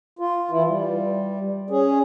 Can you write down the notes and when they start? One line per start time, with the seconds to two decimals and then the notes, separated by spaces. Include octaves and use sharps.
0.19 F4
0.51 E3 E4
0.68 G3
1.70 C#4 G#4